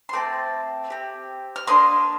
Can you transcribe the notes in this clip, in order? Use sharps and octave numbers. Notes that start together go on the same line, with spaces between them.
C6
A3 C4 A4 D6
C4 G4
F6
A#3 D4 C6 D#6